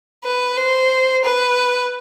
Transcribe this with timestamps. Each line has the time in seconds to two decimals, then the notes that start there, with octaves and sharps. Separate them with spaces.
0.24 B4
0.58 C5
1.25 B4